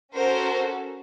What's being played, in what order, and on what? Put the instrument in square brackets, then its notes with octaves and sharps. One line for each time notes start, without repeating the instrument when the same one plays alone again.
[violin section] C#4 F#4 A4 A#4 C5